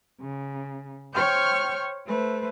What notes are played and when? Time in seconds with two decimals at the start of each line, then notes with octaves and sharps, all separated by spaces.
0.21 C#3
1.13 C5 C#5 G5 C#6 F6 G6
2.06 A3 B4 C5